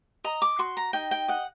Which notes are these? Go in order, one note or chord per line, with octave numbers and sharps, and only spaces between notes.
D#5 A#5
D6
F#4 C6
A#5
D#4 G5
G5
D#5 F#5